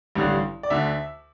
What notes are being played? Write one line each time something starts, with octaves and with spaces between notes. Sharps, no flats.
A1 G2 D3
D5
D2 D3 E5